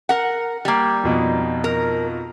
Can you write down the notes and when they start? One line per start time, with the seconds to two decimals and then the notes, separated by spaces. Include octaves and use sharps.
0.09 A#4 F#5
0.65 G3 A#3
1.03 F2 B2 D#4
1.64 A#4